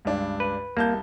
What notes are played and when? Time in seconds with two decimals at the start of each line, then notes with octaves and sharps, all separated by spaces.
0.05 C#2 G2 D4
0.40 B4
0.77 C2 A#3 A5 G6